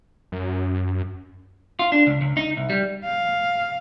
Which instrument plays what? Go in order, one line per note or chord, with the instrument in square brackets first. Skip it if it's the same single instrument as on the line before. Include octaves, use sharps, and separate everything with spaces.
[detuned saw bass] F#2
[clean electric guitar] F4
D4
C#2
C#2
D#4
C2
G3
[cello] F5